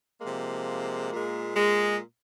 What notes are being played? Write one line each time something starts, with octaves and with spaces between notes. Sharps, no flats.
C3 F3 G#3 A#3
A#2 G#3
G#3